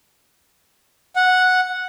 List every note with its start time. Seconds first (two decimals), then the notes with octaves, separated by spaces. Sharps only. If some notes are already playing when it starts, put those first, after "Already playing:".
1.16 F#5